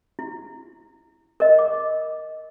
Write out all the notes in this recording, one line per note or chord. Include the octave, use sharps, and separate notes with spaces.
E4
A#4 D#5
D6